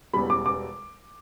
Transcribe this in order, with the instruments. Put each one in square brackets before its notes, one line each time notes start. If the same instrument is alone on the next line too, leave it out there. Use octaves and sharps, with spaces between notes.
[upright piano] E1 E2 B2 G3 B5
D6
D6